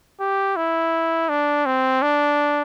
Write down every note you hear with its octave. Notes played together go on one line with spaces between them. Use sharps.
G4
E4
D4
C4
D4